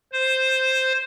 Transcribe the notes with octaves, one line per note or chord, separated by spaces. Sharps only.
C5